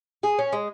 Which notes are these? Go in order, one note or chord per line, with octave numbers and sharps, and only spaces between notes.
G#4
C#4
G#3